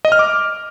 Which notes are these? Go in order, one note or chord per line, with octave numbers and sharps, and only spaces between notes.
D#5
F6
D6